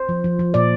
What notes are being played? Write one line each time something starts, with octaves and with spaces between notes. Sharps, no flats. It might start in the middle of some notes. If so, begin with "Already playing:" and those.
Already playing: C5
F3
F3
F3
A#2 D5